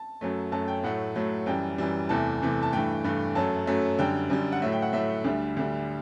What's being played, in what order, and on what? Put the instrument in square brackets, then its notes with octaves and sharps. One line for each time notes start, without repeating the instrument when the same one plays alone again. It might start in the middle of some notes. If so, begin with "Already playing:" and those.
Already playing: [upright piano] A5
F#2 F#3 A3
F#2 F#3 A3 A5
G5
A2 F#3 A3 F#5
A2 F#3 A3
F#2 E3 G3 G5
F#2 E3 G3
E2 C3 E3 A3 A5
E2 C3 E3 A3
A5
G2 E3 A3 G5
G2 E3 A3
F#2 F#3 A3 A5
F#2 F#3 A3
F#2 D3 G3 G5
F#2 D3 G3
F#5
A2 F#3 A3 E5
G5
F#5
A2 F#3 A3 E5
D2 D3 G3
D2 D3 G3